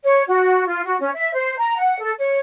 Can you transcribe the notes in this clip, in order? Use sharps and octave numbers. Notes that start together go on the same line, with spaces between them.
C#5
F#4
F4
F#4
C#4
E5
C5
A#5
F#5
A4
C#5